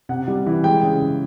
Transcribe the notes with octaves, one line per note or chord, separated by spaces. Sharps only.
C3 F#5
G3
E3
G#3 G5
C#3
C#3